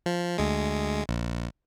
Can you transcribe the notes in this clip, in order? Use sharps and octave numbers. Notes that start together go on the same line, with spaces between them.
F3
D2 G#3
A#1